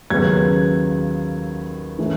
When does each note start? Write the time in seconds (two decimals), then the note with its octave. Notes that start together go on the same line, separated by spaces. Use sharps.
0.10 D#2 C#3 F#3 B3 G#6
1.99 E3 A3 C#4